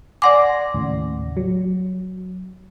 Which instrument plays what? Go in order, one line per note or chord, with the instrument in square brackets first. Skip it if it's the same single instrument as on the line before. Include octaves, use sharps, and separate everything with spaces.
[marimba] D5 F#5 D6 [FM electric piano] G#5 C6 A#6
[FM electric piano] D#2 A2 C#3
F#3